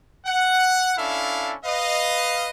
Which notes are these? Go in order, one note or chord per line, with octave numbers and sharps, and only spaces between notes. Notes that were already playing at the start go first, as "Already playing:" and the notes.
F#5
C#4 D4 E4 A4 E5 F5
B4 D#5 F5